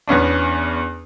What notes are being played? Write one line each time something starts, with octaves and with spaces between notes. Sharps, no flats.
E2 B3 C#4 D4